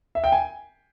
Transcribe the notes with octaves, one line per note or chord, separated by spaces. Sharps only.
E5
G5
G#5